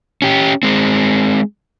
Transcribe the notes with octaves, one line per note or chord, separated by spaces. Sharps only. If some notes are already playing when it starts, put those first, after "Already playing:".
C#4 G4
G#3 C4